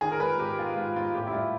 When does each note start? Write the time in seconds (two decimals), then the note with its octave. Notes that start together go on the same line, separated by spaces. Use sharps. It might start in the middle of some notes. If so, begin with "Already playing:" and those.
0.01 D#3 G#4
0.12 A#4
0.20 G#3 B4
0.39 G#2 G4
0.58 G#3 F4
0.76 G#2 F4
0.96 G#2 F4
1.15 A2 G4
1.27 E4
1.33 G3 F4